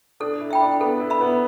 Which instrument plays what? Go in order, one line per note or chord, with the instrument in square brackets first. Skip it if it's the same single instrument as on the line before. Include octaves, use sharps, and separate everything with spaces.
[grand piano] D4 [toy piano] A4
[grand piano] E4
[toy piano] E5 G5 B5
[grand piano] D4
[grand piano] B3 [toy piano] A4
[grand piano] E4
[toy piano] E5 B5
[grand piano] B3